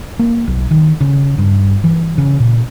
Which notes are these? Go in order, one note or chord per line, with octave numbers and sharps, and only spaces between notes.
A#3
B1
D#3
C#3
G2
E3
C#3
A#2